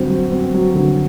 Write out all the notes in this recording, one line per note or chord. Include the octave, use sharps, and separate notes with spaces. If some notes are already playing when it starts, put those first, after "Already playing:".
Already playing: G1 F#3 C4
F#3
C4
F#3
G1